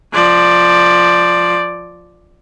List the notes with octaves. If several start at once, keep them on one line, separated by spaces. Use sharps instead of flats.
F3 D5